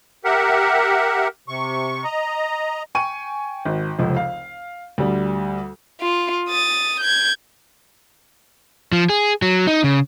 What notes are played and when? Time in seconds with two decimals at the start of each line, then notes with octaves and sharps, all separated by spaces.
0.24 G4 A#4 E5 F#5
1.48 C3 C#6
2.04 D#5 A#5
2.95 G5 G#5 C#6 D#7
3.65 G#1
3.99 F1 C#2 F3
4.17 F5
4.98 D2 G3
6.00 F4
6.49 D#6 A6
7.01 G6 G#6
8.92 F3
9.09 G#4
9.42 F#3
9.67 D#4
9.84 C#3